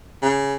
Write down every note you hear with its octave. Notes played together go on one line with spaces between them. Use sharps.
C#3